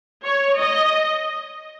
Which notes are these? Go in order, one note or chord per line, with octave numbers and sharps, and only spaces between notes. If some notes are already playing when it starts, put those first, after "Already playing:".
C#5
D#5